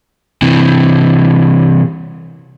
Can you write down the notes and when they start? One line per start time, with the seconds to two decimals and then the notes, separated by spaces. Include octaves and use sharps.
0.42 C3 E3